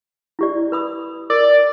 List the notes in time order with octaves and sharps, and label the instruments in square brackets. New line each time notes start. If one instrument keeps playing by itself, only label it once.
[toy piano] E4 G4 D5
B4 B5 D#6
[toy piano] A#4 [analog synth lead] D5